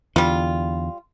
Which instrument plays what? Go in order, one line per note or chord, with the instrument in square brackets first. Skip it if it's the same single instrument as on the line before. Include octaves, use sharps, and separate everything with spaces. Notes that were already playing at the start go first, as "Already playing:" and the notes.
[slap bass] E2 D3 [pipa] G3 F4